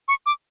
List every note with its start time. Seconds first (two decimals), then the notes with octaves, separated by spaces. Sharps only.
0.08 C#6
0.26 D6